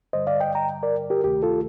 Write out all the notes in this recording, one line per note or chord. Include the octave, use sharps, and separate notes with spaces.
G2 D3 G3 C5 D#5
D5 F5
D#5 G5
G5 A#5
A#4 D5
G4 A#4
D2 C3 D#3 A3 G4
F4 A4